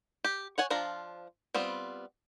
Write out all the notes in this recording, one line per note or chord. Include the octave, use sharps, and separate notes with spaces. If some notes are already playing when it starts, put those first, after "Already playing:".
G4
C#5 F#5 G#5
F3 D4 F4 A#5
G3 B3 C4 F4